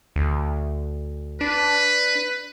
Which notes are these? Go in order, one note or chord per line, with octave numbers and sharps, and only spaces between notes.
D2
D4 B4